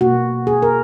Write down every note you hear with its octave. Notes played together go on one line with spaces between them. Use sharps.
B2 A#3 F#4
G#4
A#4